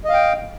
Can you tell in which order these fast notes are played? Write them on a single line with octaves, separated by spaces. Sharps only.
D#5 F5 G5